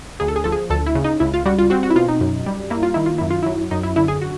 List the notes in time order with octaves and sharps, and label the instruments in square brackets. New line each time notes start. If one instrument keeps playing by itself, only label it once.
[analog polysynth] D2 G#4
A4
G#4
F3 A4
G#4
D2 A4
E4
C#3
D#4
C#2 E4
F4
G3 F#4
F4
C4 F#4
F#4
E4
B2 F4
D#4
F#2
G3
A#3 E4
F4
D#3 E4
F4
F#2 E4
F4
F#3 E4
F#2 D#4
E4
D3 E4
G#4
F#4